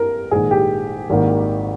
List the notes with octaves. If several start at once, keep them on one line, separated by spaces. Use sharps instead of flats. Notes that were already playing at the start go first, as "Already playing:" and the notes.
Already playing: G2 C4 A#4
A#1 G#2 D#3 G#4
G4
G#1 G#2 D#3 A#3